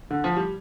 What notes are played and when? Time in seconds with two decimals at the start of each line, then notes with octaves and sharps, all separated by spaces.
0.11 D3
0.24 F3
0.37 G3